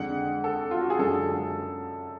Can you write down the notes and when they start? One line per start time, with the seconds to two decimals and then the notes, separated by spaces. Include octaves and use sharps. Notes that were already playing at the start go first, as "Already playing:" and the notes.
Already playing: F2 D3 G#3 F#5
0.44 A4
0.71 F4
0.81 F#4
0.90 G#4
0.99 F#2 D3 G#3 A4